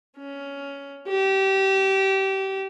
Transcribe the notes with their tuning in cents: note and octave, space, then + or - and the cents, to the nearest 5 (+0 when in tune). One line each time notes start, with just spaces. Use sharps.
C#4 +10
G4 -25